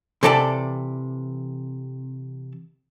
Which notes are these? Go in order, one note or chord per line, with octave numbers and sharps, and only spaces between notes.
C3 E3 A4 D5 A5